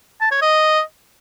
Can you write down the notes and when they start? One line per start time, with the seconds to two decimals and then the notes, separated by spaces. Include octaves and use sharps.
0.21 A5
0.31 C#5
0.42 D#5